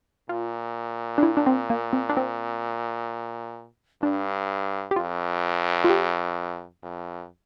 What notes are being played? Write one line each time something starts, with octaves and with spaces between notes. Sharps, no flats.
A#2 F4
D4
E4
D4
C4
A#3
C4
D4
C4
G2 D4
G4
F2 F4
F4
G4
F2